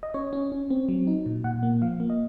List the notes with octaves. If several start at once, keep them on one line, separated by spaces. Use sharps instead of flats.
D#5
C#4 C#5
C#4
C#4
C4
F#3
D#4
A#2
A#2 F#5
A#3
F3 F5
A#3
D#5